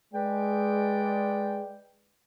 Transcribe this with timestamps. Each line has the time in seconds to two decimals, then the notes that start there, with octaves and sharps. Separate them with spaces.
0.14 G#3 B4 D5 G5